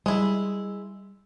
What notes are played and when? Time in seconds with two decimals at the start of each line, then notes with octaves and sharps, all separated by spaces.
0.06 G3 G#3 E4